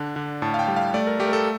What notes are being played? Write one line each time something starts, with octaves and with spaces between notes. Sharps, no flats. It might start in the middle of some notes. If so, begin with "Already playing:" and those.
Already playing: D3 D4
D3
A2 A5
F5
G5
G3
F5
A3 D5
A#4
A3 G4
A#4
A4